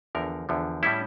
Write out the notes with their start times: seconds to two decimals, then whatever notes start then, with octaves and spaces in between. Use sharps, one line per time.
0.15 E2 D3 F3 A#4
0.49 E2 D3 F3
0.83 A2 G3 C#4 E4